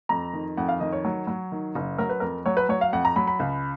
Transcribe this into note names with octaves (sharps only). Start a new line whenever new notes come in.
F2 A#5
D#3
F2 F#5
F5
D#3 D#5
C#5
F#3
F#3
D#3
F#1
F#3 A#4
B4
F2 A#4
F#3 C#5
B4
F#3 C#5
F5
F2 F#5
A#5
F#3 B5
B5
C#2